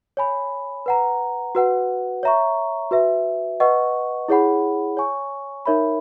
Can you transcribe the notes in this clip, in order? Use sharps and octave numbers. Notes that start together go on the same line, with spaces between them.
C#5 G#5 B5
B4 F#5 A#5
F#4 B4 F#5
C#5 E5 A#5 C#6
F#4 B4 E5
B4 D#5 F#5 C#6
E4 G#4 C#5 F#5 B5
C#5 G#5 C#6
D#4 A#4 C#5 E5 B5